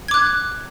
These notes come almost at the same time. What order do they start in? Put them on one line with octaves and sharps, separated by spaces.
G#6 D6 F#6